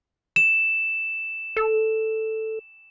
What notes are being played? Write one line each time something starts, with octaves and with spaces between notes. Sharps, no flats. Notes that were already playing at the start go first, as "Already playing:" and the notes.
E7
A4